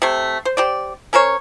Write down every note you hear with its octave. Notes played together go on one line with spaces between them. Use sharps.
C3 A3
C5
G4 C5 D5
C#4 A#4 C5 C#5